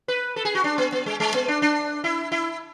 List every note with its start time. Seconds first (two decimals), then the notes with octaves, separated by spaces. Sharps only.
0.08 B4
0.36 A4
0.45 G#4
0.55 F#4
0.64 D4
0.78 B3
0.92 B3
1.06 G#3
1.20 G#3
1.34 B3
1.48 D4
1.62 D4
2.04 E4
2.32 E4